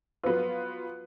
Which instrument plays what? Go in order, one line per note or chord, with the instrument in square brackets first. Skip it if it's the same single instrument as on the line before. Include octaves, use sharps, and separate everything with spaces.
[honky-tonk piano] F#3 B3 F4 [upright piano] B4